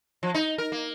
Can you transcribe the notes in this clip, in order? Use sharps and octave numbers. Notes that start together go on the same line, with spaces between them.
F3
D#4
A#4
A#3